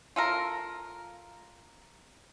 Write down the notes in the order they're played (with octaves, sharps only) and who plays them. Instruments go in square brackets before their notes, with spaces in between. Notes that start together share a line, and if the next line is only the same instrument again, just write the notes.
[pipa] F4 A4 A#4